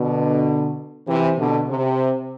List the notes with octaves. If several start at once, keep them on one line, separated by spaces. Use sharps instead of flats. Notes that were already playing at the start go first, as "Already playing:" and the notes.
Already playing: B2 D3
C3 E3
B2 D3
C3